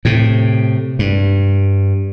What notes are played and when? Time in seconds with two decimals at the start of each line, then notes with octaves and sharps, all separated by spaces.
0.05 A2 C3
0.99 G2